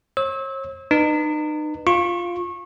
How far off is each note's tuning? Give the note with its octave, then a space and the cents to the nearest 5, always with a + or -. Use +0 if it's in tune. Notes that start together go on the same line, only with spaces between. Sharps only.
C#5 -45 E6 -30
D#4 -35 B4 +0
F4 +0 C#6 -25